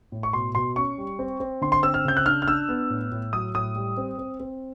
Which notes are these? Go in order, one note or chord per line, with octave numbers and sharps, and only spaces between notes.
A2
C#6
B2 C6
B2 C6
C#4 C#6
G3
C4
C4
D3 C6
C6
C4 E6
F6
C#3 G6
F#6
D4 F6
F6
D4 E6
B3
A2
A2
F#3 D#6
A2 D#6
G3
C4
C4
C4